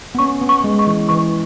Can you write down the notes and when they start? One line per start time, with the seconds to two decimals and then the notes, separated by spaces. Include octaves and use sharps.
0.15 B3
0.19 C#4 C#6
0.41 B3
0.49 C#6
0.64 G#3
0.79 C#6
0.87 E3
1.09 E3 C#6